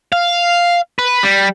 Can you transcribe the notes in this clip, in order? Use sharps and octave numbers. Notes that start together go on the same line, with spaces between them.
F5
B4
G3